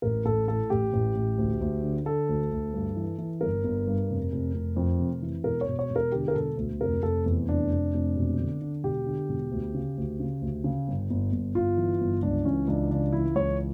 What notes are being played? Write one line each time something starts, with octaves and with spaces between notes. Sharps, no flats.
A1 A#4
A1 A4
A2 A4
A1 G4
A1
A1
D2
D2
D3
D3 A4
D2
D2
G2
E3
E3
G1 A#4
G1
G2
F1
F1
F1
F2
F1
E3
E1 A#4
C#5
E1
C#5
E1
A#4
D3 G4
A#4
E1 A4
D2
F1 A#4
F1 A4
E2
F1 D4
F1
F1
E1
D3
D3
E1 G4
D3
E1
D2
C#3
D2
C#3
D2
C#3
G1
G1
G1
G1 F4
E3
G1
C#2 D4
E3 C#4
C#2 D4
C#3 D4
E3 E4
C#2 C#5